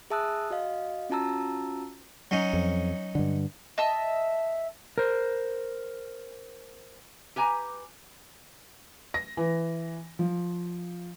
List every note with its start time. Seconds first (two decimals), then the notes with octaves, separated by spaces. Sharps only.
0.10 G#4 E5 A5 D#6 E6 F#6
0.50 F#4 D#5 F5
1.10 C#4 F4 F#4 A5 A#5 E6
2.31 F#3 C#4 D#4
2.53 F2
3.15 G2 D3
3.78 D#5 E5 A5 E6
4.98 A#4 C5
7.36 G4 B4 G#5 A#5
9.14 A#6
9.37 E3
10.19 F3